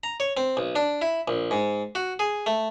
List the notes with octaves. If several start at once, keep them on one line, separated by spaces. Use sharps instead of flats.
A#5
C#5
C4
B1
D4
E4
A#1
G#2
F#4
G#4
A3